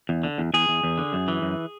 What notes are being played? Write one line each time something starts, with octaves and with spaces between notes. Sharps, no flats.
E2
D3
E2
E2 G#4
E2
E2
D3
F#2
E3
F#2